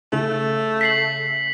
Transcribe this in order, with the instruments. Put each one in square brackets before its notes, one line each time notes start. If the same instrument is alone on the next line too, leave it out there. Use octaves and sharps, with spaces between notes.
[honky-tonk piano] C#3 [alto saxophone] A3
[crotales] B6 C7 F#7